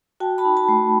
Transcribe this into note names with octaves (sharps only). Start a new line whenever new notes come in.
F#4 G5 A5
A5 B5
D#4
A5 B5
A3